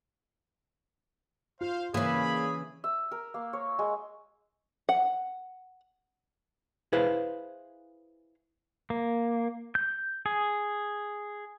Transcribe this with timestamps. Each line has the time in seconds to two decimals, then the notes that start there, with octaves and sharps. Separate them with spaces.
1.61 F4 C5 F5
1.94 C#3 E3 A#3 G#4 C#5 D5 B5
2.84 E5
3.11 A#4
3.34 A#3
3.53 C#5
3.79 G#3
4.89 F#5
6.93 E4 G#4 B4 C5 F5
8.90 A#3
9.75 G6
10.26 G#4